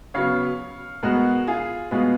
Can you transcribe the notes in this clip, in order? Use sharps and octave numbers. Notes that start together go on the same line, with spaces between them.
C#3 F#3 B3 C#5 F5
B2 G#3 B3 F#4 A#4
F4 G#4
B2 G#3 B3 F4